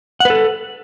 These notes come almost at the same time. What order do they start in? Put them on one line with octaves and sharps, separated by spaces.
F#5 B4 A4